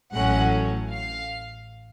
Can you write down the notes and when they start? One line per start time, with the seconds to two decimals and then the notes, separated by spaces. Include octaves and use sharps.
0.13 A1 A2 F#3 A3 C#4 F#5
0.91 F5